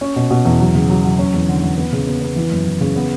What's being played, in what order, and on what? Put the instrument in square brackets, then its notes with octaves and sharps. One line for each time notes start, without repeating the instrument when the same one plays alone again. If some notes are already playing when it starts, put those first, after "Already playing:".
[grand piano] C#4
B2
B2
E2
F#3
C#3
F#3
F#3
C#4
E2
D3
E2
B3
C#3
B3
B3
E3
F#2
E3
C#3
B3